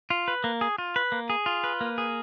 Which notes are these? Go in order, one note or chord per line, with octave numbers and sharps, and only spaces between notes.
F4
B4
A#3
G#4
F4
B4
A#3
G#4
F4
B4
A#3
G#4